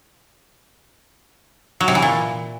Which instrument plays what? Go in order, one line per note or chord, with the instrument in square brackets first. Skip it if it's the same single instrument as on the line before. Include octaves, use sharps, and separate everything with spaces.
[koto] F#3
C3
E3
A#2